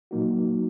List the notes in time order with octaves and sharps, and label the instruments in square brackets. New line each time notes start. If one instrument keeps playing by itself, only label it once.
[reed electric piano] A#2 F#3 A#3 D#4 F#4